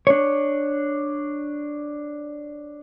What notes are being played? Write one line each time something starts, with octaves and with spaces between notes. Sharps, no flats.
D4 C#5